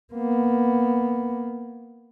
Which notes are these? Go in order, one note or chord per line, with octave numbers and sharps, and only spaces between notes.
A#3 B3